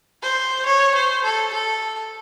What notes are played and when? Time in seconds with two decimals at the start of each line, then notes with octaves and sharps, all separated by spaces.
0.23 C5
0.66 C#5
0.95 C5
1.24 A4
1.53 A4